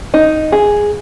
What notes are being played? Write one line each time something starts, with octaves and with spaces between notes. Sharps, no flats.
D#4
G#4